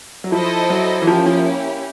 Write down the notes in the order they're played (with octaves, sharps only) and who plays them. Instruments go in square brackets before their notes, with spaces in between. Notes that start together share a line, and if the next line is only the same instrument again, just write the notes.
[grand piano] F#3
[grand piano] F3 [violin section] E4 A4 C5 D#5
[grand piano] F#3
E3
[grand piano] F3 [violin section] A#3 C#4 E4 G4
[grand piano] F3